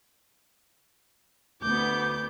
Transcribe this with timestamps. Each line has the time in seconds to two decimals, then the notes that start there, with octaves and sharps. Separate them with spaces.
1.62 D2 B3 D6 G6